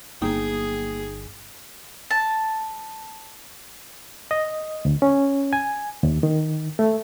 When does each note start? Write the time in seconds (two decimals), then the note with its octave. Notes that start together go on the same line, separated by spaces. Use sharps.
0.22 G1 F#3 A#3 D#4 G#4 G5 D#6
2.11 A5
4.31 D#5
4.85 D2
5.02 C#4
5.53 G#5
6.03 D#2
6.23 D#3
6.79 A3